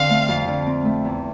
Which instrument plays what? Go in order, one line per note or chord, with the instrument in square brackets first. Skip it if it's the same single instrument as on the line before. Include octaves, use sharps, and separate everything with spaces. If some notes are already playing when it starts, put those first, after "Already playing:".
Already playing: [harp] F2 D3 C4 [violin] F5
[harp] A3
F2
D3
C4
A3
E2